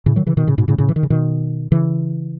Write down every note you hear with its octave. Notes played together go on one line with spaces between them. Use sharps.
A2 C#3
D#3 F#3
C#3 E3
B2 D#3
A2 C#3
G#2 B2
A2 C#3
A2 C#3
E3
D#3
C#3
B2 D#3
C#3 E3